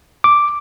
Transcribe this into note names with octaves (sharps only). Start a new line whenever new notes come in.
D6